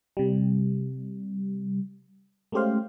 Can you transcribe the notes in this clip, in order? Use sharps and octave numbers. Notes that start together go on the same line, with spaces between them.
C3 G3
G#3 A3 C#4 G4 C5 F5